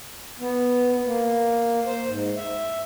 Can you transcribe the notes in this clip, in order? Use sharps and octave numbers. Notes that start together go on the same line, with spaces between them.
B3
A#3
C5
G#2
E5